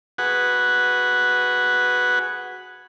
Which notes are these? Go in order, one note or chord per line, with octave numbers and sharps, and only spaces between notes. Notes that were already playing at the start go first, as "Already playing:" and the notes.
F#4 G#4 B4 F#5